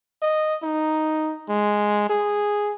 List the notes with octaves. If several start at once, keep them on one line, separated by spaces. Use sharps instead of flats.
D#5
D#4
G#3
G#4